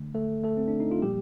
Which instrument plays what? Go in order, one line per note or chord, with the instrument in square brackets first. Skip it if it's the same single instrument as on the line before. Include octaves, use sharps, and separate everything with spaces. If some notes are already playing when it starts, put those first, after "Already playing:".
Already playing: [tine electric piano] D3 A3
A3 A4
A3 A4
C4
D4
D#4
F4
A#2 F3 G3 A#3 G4